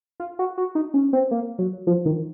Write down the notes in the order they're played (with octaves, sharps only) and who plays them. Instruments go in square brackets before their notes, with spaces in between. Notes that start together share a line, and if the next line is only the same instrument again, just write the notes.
[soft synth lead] F4
F#4
F#4
D#4
C#4
C4
A#3
F#3
F3
D#3